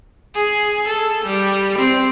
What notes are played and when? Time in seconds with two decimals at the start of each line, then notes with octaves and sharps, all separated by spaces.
0.35 G#4
0.88 A4
1.25 G3
1.78 C4